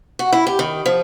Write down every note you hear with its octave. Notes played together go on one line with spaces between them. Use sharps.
F#4
E4
G4
D#3
F3